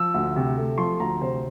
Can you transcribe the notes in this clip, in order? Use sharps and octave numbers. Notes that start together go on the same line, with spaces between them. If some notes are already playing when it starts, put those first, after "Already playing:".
Already playing: F3 E6
D2
C3
A3
F3 C6
D2 A#5
C3 C5